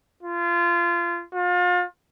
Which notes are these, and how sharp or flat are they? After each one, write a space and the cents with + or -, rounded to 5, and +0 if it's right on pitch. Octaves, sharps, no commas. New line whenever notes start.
F4 -25
F4 +35